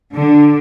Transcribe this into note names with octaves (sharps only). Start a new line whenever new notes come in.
D3